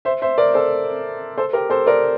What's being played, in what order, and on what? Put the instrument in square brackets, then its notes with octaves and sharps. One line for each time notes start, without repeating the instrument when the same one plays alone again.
[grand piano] C5 E5
C5 E5
A#4 D5
A4 C5
A4 C5
G4 A#4
A4 C5
A#4 D5